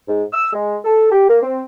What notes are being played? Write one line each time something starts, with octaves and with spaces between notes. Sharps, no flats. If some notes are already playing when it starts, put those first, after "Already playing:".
G#2
E6
G#3
A4
G4
A#3
C4